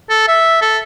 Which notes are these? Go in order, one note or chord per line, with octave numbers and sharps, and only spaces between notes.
A4
E5
A4